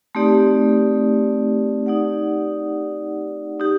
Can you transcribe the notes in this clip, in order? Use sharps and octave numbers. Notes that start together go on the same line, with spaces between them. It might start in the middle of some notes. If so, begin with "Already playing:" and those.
A3 C4 D#4 G4 D5
D#4 G4 D5 F#5
D#4 G4